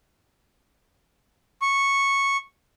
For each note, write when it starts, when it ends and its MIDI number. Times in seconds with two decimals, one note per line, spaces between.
1.62 2.37 85